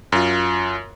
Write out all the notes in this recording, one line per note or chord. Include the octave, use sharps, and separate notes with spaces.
F#2 F4